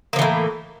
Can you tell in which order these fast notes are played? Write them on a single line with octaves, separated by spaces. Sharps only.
A#3 F3 E3 A2